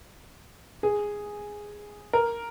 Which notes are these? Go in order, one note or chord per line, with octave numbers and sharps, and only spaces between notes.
G#4
A#4